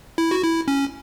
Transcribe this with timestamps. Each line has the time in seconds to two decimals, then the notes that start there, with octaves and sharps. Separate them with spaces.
0.18 E4
0.31 F#4
0.43 E4
0.68 C#4